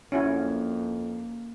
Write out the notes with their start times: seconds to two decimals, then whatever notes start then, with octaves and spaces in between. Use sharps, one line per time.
0.12 F2 A#3 C#4 E4 F#4